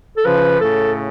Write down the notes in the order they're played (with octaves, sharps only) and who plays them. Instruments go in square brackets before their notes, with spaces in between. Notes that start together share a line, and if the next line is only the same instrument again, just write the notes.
[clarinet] A4
[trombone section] C#3 F3 [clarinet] B4
[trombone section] A2 C#3 [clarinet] A4